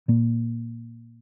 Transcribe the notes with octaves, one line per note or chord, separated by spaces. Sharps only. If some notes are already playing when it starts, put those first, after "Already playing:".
A#2 A#3